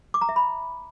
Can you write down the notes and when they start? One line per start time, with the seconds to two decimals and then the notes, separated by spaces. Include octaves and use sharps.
0.14 D6
0.21 A#5
0.29 E5
0.36 B5